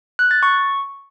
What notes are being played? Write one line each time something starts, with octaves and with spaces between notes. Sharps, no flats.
F#6
A6
C#6